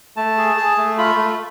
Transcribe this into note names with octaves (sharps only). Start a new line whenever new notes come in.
A3 A5
G#4
G#4
A3
F4 B5
A3